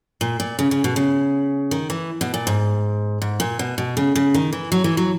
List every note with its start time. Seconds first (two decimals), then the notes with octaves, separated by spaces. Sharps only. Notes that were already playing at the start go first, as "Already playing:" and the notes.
0.21 A#2
0.40 A#2
0.59 C#3
0.71 C#3
0.84 B2
0.96 C#3
1.71 D#3
1.90 E3
2.21 B2
2.34 A#2
2.47 G#2
3.22 G#2
3.40 A#2
3.59 B2
3.78 B2
3.97 C#3
4.15 C#3
4.34 D#3
4.53 E3
4.72 F#3
4.84 E3
4.97 F#3